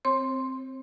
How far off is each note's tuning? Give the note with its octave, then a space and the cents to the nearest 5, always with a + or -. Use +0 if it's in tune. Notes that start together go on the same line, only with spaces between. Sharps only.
C4 +0 C#5 -45 C6 +0